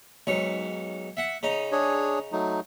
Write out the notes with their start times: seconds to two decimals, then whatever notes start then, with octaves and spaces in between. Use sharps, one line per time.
0.27 B1 G#2 C#5
1.17 E5 F#5
1.43 C#3 D#4
1.72 D4 G#4 C#5
2.32 F#3 A3 D#4